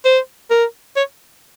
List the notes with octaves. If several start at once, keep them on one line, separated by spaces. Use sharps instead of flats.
C5
A#4
C#5